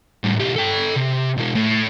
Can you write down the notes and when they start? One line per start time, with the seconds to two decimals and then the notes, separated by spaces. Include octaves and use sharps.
0.24 A2 G3
0.40 B1 G4
0.56 A4 G5
0.97 C3
1.37 B2 E3
1.55 A2